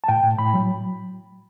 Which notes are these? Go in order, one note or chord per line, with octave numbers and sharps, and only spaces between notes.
A5
A2 G5
A2
A2 B5
F#3